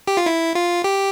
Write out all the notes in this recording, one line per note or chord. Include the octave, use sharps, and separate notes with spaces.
G4
F4
E4
F4
G4